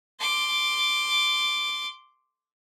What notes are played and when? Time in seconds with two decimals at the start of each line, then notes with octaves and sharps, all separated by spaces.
0.20 C6 D6